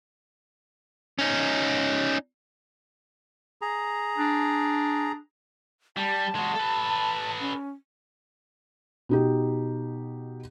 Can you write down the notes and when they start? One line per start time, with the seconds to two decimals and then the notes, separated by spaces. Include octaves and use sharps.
1.19 C#4 D#4
3.62 G#4 A#5
4.18 D4
5.97 G3 A5
6.35 G#3 F#4
6.55 A4 B4
7.40 C#4
9.09 B2 D#4 G4